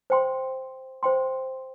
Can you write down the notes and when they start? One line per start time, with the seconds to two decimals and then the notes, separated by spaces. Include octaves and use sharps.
0.10 C5 G5 C6
1.03 C5 G5 C6